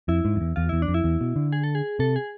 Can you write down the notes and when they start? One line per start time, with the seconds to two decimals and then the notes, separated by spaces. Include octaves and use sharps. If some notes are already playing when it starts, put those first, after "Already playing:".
0.08 F2 E4
0.25 G#2
0.36 F2
0.41 E2
0.56 E2 F4
0.69 E2 E4
0.82 D4
0.88 F2
0.94 E4
1.04 E2
1.21 B2
1.36 D3
1.53 G#4
1.64 A4
1.75 G#4
1.99 C3 A4
2.16 G#4